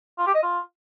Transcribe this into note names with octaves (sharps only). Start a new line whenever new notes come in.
F4
G4
D#5
F4